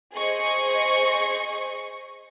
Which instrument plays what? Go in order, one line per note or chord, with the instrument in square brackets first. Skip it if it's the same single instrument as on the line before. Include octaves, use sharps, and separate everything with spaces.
[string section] G#4 C5 D#5 C#6